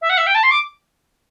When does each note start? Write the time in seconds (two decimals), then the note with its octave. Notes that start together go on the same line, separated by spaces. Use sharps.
0.02 E5
0.10 F#5
0.17 E5
0.27 G5
0.35 A5
0.43 C6
0.51 D6